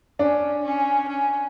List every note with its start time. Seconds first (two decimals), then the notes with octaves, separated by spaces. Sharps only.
0.19 C#4 D4
0.64 C#4
1.09 C#4